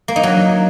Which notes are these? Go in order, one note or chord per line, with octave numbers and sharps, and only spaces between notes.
A#3
D#4
F#3